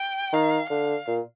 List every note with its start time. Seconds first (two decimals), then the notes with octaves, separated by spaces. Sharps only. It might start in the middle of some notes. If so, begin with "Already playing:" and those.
Already playing: G5
0.33 D#3 F5
0.70 D3 F5
1.08 A#2